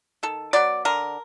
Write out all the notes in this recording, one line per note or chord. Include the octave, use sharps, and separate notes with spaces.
D#3 A4
F#3 B3 D5
D3 A#4